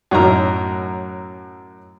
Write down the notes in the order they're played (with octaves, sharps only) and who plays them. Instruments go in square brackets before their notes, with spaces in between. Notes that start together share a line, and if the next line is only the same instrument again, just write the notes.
[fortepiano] F#2 A2 F#3 D#4 A#5 F6